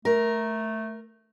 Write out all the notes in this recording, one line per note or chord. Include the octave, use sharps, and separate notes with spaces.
A3 A#4